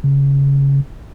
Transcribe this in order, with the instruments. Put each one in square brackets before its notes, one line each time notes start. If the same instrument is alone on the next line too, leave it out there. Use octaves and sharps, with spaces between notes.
[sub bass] C#3